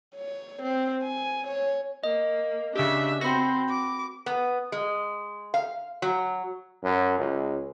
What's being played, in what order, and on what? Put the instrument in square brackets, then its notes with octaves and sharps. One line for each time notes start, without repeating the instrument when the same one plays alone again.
[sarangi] C#5
C4
G#5
C#5
[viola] A#3 [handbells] D#5
[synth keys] C#3 G4 [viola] D4 E5
[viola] C4 [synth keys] F#4 [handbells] B5 A#6
[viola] D6
[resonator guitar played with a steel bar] B3
G#3
F5
F#3
[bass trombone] F#2
C#2